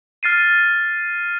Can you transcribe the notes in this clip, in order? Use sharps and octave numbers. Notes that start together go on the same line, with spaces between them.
F6 A6 C7 D#7